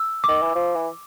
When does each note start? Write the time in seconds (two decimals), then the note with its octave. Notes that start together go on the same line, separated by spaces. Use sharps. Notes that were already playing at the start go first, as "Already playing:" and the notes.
Already playing: E6
0.24 D6
0.28 D#3
0.42 E3
0.55 F3
0.75 E3